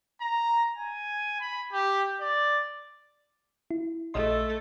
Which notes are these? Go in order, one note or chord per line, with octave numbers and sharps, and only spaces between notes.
A#5
G#5
B5
G4
D5
E4
A#1 A3 D#5 C6